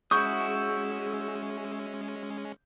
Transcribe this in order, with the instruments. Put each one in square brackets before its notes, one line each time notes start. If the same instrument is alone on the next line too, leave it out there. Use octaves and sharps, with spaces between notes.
[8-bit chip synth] G#3 C#4 [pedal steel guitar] E4 F#4 D#6 [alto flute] G#4 [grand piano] C#6 G6